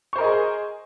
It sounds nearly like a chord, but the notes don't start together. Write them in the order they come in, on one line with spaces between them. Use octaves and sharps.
C#6 C5 A#4 D#5 G#4